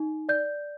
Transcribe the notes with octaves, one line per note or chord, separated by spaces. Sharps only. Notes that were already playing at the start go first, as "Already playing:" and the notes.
Already playing: D#4
D5 G6